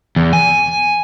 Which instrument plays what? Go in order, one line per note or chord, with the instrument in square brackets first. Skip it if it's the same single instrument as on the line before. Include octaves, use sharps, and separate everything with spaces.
[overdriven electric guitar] E2
G#5